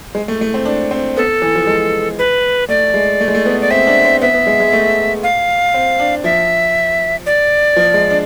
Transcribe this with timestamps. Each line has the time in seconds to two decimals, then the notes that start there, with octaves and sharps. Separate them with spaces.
0.15 G#3
0.28 A3
0.41 A3
0.54 C4
0.65 D4
0.91 C4
1.16 B3 A4
1.42 E3
1.55 F3
1.67 G#3
2.19 B4
2.69 A3 D5
2.94 G#3
3.21 A3
3.28 G#3
3.35 A3
3.45 B3
3.61 D5
3.71 C4 E5
3.87 D4
4.05 C4
4.21 B3 E5
4.34 B3
4.47 G#3
4.60 G#3
4.73 A3
5.23 F5
5.74 C4
6.00 D4
6.24 F3 E5
7.26 D5
7.76 F3
7.94 G#3
8.10 D4